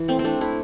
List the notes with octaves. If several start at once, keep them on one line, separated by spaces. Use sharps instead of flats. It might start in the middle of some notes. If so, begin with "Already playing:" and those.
Already playing: E3
A3 C4
C4
A3 D4
A3 E4